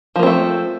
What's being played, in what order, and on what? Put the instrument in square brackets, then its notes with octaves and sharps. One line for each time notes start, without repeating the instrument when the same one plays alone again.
[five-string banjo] F3
A#3
C4
A3